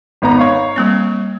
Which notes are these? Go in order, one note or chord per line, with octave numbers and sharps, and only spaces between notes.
G#1 B3 A#5
C#5 F5 C#6
G3 A#3 C4